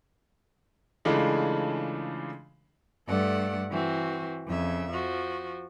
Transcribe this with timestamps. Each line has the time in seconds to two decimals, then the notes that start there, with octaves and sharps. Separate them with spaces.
1.05 C#3 E3 G#3 A3 D4 F4
3.07 G2 A3 A4 D5 F#5
3.70 E3 C4 F#4
4.47 F2 C#3 E5
4.91 F3 F#4